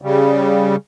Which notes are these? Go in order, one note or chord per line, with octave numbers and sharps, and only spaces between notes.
C#3 G3